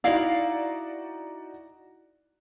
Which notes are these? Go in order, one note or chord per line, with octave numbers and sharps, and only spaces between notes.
D#4 E4 F#4 D5 F5